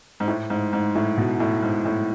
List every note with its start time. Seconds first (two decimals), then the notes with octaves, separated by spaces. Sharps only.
0.20 G#2
0.28 A2
0.50 G#2
0.73 G#2
0.95 A2
1.17 B2
1.40 A2
1.63 G#2
1.85 A2